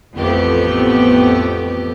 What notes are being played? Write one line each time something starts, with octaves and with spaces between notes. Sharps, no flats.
A1 F2 A3 B3 G4